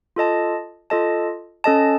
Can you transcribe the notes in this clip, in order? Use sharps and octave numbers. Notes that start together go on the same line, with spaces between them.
F4 A4 D#5 A5
F4 A4 D#5 A5
C#4 A4 D#5 A5